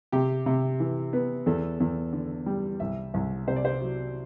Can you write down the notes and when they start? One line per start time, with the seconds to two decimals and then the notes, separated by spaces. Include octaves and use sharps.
0.12 C3 G4
0.46 C3
0.80 E3
1.13 B3
1.46 E2 A4
1.80 E2
2.13 D3
2.46 G3
2.80 C2 E5
3.14 C2
3.48 C3 C5
3.56 D5
3.65 C5
3.81 F#3